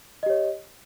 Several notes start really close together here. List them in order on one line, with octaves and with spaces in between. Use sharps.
D#5 G4 C#5